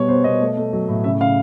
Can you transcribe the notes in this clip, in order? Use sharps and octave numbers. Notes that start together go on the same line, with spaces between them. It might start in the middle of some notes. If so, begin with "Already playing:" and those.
Already playing: B2 G3 C#5
B3 C5
B2 D#5
A3
A3
F#3
A2
C#3 E5
C#3 F5